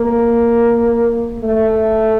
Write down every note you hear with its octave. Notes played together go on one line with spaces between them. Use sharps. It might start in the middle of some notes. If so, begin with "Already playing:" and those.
Already playing: A#3
A3